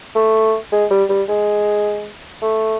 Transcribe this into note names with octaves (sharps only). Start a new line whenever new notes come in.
A3
G#3
G3
G3
G#3
A3